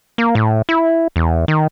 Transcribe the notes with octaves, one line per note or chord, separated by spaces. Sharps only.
A#3
A2
E4
E2
D#3